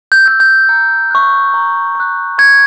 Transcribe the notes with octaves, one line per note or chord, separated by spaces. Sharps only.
G6
E6 G6
G6
A#5
C#6 F#6
A#5
C#6 F#6
C#6 G#6